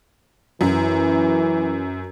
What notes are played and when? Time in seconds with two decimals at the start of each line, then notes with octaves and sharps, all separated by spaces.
0.61 F#2 E3